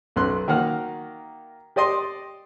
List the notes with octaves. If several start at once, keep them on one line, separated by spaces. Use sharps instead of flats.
B1 F#2 B3 C6 F#6
D#3 A#3 F#4 F#5 F6
G4 D5 D#5 C6